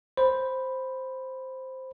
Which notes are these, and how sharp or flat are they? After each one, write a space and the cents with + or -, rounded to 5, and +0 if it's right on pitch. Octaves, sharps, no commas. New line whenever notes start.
C5 +0 B5 +0